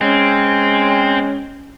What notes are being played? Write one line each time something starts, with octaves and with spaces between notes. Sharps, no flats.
G#3 C4 C#4